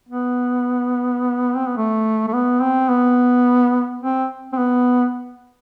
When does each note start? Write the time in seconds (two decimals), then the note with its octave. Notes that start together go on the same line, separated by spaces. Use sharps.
0.09 B3
1.56 C4
1.67 B3
1.77 A3
2.28 A3
2.33 B3
2.62 C4
2.89 B3
4.02 C4
4.53 C4
4.58 B3